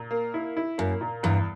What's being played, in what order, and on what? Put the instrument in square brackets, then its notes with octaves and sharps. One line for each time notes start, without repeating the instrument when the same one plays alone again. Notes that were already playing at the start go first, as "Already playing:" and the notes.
Already playing: [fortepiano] A#2
A#3
E4
E4
[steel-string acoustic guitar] F#2 [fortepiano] A#3
[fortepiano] A#2
[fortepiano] E2 [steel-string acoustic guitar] G2